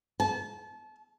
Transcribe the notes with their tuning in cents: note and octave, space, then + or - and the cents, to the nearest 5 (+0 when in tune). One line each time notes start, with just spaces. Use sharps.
A5 -30